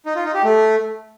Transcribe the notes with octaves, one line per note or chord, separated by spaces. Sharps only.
D#4
F4
D#4
G4
A3